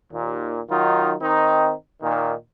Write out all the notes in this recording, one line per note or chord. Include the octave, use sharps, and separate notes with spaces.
D#2 A#2
D#3 F#3 D#4 F4
D#3 C4 D#4
A#2 D#3